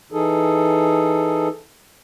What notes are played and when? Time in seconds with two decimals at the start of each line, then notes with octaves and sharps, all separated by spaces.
0.12 E3 D#4 G#4 A4